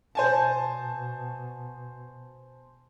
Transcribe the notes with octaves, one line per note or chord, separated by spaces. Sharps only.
B2 C5 G#5 A5